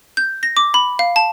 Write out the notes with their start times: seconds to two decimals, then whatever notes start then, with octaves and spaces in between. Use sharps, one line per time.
0.17 G6
0.43 A#6
0.57 D6
0.74 B5
0.99 F5
1.16 A5